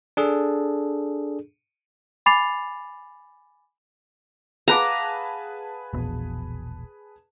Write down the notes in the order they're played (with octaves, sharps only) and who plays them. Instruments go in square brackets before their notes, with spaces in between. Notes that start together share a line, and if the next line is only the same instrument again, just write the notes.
[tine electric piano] D4 G#4 A4
[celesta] G#5 B5 D6 A6 C7 F7
[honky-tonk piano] G#4 B4 A5 [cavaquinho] F5 F#5 D6 [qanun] A#5
[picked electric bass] E1 A#1 B2